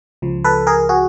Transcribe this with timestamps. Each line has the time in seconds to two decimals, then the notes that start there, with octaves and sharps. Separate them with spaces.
0.22 C#2 C#3 F3
0.44 A4 B4
0.67 G#4 A#4
0.89 F#4 G#4